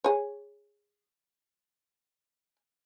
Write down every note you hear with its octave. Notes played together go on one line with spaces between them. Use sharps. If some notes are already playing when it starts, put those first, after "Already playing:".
G#4 C#5